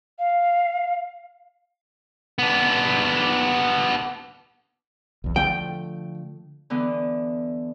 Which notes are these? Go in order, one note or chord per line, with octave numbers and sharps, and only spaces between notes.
F5
B3 D4
B1 E2
D3 F3 A3 G5
D3 E3 B3